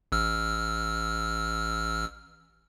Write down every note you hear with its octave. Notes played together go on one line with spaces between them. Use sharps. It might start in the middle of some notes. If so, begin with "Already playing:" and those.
A1 E6 F6